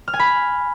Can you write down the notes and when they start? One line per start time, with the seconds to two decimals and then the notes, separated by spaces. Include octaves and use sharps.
0.08 F6
0.13 G#5
0.19 B5